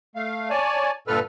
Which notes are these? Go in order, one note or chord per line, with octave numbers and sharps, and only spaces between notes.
A3 F5
C#5 D5 G#5 A5
G2 A#2 D3 A4 B4 F6